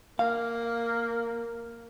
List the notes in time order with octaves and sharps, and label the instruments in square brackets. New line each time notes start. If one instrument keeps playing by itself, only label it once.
[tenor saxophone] A#3 [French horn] A#4 [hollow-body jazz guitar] F5